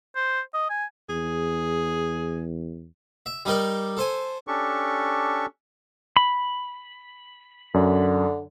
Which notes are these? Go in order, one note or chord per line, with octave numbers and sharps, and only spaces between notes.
C5
D#5
G#5
E2 G#4
E5
G3 D#4 G4 A#4 D5
A4 C5 G#5
C#4 D4 G4 A4 C#6
B5
F#2 D3